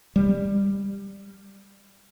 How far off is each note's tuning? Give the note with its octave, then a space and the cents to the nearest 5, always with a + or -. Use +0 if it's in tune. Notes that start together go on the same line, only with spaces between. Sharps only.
G3 +15